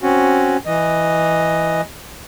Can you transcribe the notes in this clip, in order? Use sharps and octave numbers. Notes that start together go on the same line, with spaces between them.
C4 C#4 F#4
E3 D#5